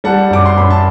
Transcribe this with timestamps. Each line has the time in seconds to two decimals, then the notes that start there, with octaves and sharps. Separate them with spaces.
0.04 G3 F#5 A5
0.30 F#2 D6
0.46 C6
0.56 F#2 B5
0.70 A5